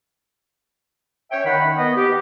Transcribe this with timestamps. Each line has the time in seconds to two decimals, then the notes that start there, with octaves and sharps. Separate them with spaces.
1.32 C#4 C#5 E5 G5
1.45 D#3 F#5 B5
1.78 B3 D#5
1.96 G4